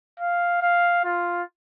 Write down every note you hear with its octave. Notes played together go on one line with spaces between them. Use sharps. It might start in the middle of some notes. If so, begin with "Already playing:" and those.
F5
F5
F4